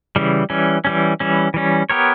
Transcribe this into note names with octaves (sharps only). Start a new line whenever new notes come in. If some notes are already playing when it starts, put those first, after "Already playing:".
C#3 E3 G3
E3 G3 C#4
E3 G3 C#4
E3 G3 C#4
E3 G3 C#4
B3 G4 A#4 C#5